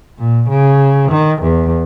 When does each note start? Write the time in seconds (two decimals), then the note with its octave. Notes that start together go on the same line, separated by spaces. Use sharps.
0.19 A#2
0.49 C#3
1.11 D#3
1.43 E2